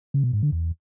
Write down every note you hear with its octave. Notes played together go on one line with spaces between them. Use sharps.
C#3
B2
G#2
D3
E2